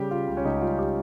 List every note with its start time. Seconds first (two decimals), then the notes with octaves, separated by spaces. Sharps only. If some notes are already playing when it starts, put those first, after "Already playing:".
Already playing: C#3 G3 G4
0.11 C#3 F4
0.27 C#2
0.37 C#4
0.45 C#2 D#4
0.61 G3 F4
0.79 G4